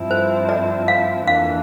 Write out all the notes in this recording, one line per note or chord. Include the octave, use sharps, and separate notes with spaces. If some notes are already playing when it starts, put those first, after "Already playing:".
Already playing: G2 F3 C4 E4
C5
D5
F5
F2 E3 A#3 D4 F5